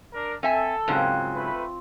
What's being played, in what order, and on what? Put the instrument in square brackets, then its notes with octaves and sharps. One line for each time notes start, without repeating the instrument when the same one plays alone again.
[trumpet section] D4 A#4
[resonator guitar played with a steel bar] C4 E5 G#5 [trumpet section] A4
[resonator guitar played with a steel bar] G#2 C#3 F#3 [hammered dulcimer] C4 F4
[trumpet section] A3 B4